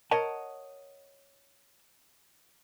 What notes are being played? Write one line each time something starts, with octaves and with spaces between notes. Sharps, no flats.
A#4 C#5 D#5 F#5 A5